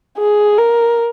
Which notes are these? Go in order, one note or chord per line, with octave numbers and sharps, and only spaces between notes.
G#4
A#4